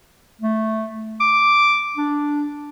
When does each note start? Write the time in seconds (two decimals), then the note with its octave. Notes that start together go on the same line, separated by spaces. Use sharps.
0.41 A3
1.20 D6
1.97 D4